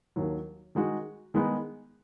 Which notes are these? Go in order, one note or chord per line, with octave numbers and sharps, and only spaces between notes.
D#2 D#3 F#3
D#3 G#3 D#4 F#4
D#3 G#3 B3 D#4